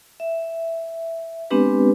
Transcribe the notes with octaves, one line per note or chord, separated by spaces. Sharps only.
E5
G#3 B3 C4 D4 G4 B4